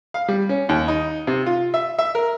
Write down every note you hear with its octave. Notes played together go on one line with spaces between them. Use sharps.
F5
G3
C#4
D#2
D#4
C3
F4
E5
E5
A#4